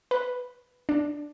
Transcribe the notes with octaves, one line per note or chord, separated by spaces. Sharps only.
B4
D4